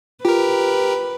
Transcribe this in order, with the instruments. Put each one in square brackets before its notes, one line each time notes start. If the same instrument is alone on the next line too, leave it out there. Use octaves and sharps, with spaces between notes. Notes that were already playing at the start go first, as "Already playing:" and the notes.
[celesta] F4 [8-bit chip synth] G4 A#4 [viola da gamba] B4